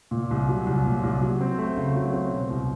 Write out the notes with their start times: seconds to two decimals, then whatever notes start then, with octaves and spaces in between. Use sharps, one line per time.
0.11 A#2
0.31 C2
0.49 F#3
0.66 C2
0.86 A#2
1.03 C2
1.21 F#3
1.40 C4
1.58 A3
1.77 C#3
1.96 F#3
2.14 C4
2.31 B2
2.50 C2